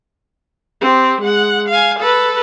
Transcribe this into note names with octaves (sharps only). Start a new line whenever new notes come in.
C4 G4
G#3 F#5
F5 G#5
A4 B4